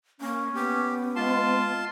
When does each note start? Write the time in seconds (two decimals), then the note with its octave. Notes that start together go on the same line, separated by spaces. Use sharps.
0.21 A#3 C#4
0.55 B3 G4
1.16 G#3 F4 A5 C6